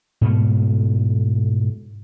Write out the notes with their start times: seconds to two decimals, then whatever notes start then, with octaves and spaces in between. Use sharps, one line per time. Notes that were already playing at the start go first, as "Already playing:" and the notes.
0.21 G#2 B2 A3